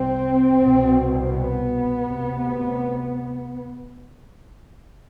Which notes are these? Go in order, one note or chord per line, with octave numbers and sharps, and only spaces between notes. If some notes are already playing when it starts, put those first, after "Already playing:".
Already playing: C2 C3 C4
C2 B2
B3
D2 C3